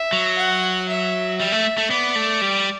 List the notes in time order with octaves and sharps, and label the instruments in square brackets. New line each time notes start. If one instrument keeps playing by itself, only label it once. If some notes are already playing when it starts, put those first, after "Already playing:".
Already playing: [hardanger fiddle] E5
[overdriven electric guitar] F#3
[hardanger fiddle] F#5
E5
[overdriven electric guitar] G3 [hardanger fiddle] E5
[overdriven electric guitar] A3
A3
[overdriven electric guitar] B3 [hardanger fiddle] D5
[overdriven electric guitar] A3
G3